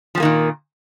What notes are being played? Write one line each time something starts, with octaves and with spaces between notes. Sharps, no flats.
A#2 D#3 F3 A#3 C4